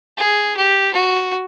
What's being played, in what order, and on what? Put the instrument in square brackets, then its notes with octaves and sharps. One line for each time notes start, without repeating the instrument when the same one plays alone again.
[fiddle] G#4
G4
F#4